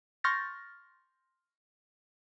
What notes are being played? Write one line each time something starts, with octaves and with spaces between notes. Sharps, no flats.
C6 C#6 F6 G6 A6 A#6